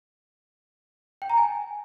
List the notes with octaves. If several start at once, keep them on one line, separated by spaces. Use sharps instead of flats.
G5
A#5
G#5